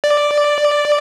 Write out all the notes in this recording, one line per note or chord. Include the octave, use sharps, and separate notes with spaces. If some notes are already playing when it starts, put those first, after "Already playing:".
D5